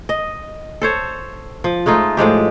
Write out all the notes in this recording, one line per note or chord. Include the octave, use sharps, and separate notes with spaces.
D#5
A4 C5 C#5
F3
G#3 A3 D#4 F4
A2 F3 G#3 G4